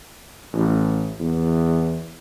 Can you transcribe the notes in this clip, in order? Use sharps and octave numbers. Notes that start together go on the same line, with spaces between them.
A1
E2